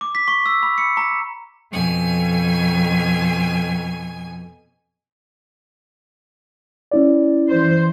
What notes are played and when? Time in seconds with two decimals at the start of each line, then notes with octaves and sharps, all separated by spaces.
0.01 D6
0.15 B6
0.28 C#6
0.46 E6
0.63 B5
0.78 C#7
0.97 A#5
1.72 F2 B2 G#5
6.91 C#4 E4 D5
7.48 E3 C5